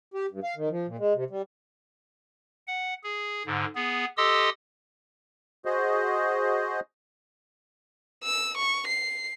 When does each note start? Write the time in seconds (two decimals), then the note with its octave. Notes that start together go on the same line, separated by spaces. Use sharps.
0.14 G4
0.31 G2
0.43 F5
0.56 D#3
0.70 F3
0.87 A#2
0.99 G#3
1.14 C3
1.30 G3
2.67 F#5
3.03 G#4
3.46 G#2 D3
3.75 B3 G#4
4.17 G4 A4 D#5 C6 D#6 E6
5.65 F#4 G#4 C5 D#5
8.24 E6
8.57 C#6
8.87 C7